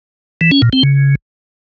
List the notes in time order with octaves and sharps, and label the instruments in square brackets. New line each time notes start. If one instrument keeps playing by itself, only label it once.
[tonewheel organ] E3
C#4
A#2
C4
C#3